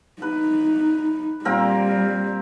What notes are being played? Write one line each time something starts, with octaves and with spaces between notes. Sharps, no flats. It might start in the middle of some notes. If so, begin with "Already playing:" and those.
D#4 B4
A#2 G3 C4 A#4